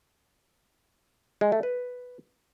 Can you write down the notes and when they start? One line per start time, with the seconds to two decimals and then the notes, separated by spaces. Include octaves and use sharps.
1.41 G#3
1.52 A3
1.63 B4